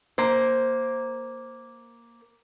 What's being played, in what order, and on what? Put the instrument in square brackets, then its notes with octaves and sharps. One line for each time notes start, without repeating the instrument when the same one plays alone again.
[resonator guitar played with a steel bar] A#3 C5